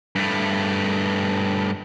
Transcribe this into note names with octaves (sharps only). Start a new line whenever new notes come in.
G2 A3